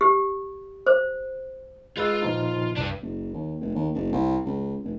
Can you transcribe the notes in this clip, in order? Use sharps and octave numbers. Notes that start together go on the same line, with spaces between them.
G4
C5
G#3 F4 B4 F5 E6
A#2 F3 D#4
C2 D4 B4
F#1
D#2
F1
D#2
F#1
C2
C#2
F1